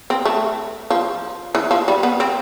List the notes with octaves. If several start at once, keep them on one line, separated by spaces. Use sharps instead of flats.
C4
A3
F3
E3
F3
G3
B3
C4